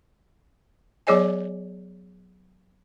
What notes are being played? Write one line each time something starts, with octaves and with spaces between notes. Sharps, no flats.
F#3 B3 G#4 C#5 D#5 G#5